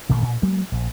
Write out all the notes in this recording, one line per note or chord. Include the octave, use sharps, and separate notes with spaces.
A1 A#2 D#3 A3
A#2
F#3 G#3 A#3
A#1